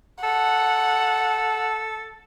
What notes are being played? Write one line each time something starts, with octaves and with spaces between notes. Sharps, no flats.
A4 F#5